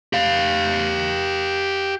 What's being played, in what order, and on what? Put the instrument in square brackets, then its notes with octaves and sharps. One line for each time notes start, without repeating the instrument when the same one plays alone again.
[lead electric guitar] G4 F5